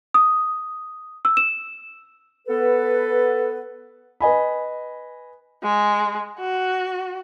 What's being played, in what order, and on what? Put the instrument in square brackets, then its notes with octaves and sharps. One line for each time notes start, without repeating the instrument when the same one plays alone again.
[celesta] D#6
E6
E7
[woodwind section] B3 A4 B4
[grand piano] B4 D#5 G#5 B5
[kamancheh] G#3
F#4